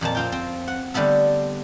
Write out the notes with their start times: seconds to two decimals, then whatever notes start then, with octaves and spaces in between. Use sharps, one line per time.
0.01 F2 A#2 F3 A5
0.15 C4 F4 G5
0.32 C4
0.67 F#5
0.94 D3 G3 A3 B3 A4